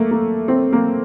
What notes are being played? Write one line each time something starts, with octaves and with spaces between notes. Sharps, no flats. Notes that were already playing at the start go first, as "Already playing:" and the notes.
Already playing: A3 A#3
A#3
C4
A#3